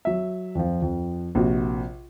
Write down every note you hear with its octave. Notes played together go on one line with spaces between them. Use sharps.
F#3 E5
F2 F3
F2
A#1 C3 F#4